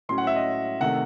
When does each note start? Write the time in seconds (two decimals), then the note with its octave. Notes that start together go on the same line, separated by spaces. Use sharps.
0.09 A2 F#3 C#4 C6
0.18 F#5
0.27 E5
0.36 D#5
0.81 C3 D#3 A3 F#5